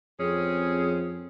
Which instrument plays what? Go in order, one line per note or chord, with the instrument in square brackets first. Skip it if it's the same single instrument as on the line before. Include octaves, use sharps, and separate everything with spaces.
[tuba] F2 [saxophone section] C4 C#4 G#4